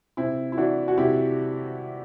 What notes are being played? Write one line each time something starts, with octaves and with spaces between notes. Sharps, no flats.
C3 C4 E4
E4
E3 D4 F#4
F#4
C3 E4 G4